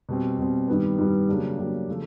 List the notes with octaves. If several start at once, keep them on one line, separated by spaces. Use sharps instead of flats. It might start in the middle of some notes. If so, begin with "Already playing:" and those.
B2 G3 C4
B2 G3 C4
G2 D#3 G3 B3
G2 D#3 G3 B3
C#3 F#3 A#3 D4 G4
C#3 F#3 A#3 D4 G4
C#3 F3 A3